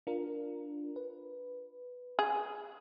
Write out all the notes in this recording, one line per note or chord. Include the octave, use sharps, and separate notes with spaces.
D4 F4 A#4
B4
G#4